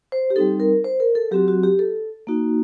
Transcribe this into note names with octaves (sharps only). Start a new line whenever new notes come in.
C5
G4
G3 C4 D#4 A4
A#4
C5
A#4
A4
F#3 C4 F#4 G4
F#4
G4
A4
A#3 D#4 F#4